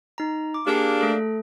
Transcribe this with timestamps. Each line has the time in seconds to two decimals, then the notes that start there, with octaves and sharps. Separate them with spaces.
0.18 D#4 A#5
0.54 D6
0.67 A#3 D4 G4 G#4
1.01 A3 A4